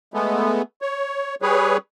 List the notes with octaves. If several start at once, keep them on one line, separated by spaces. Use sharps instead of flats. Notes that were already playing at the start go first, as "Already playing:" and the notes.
G#3 A3 B3
C#5
G3 G#4 B4 C#5